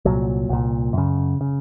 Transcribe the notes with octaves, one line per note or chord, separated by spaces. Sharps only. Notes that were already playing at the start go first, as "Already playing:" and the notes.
C2 A#2 F#3
C2 A#2
F#2 C#3
C#3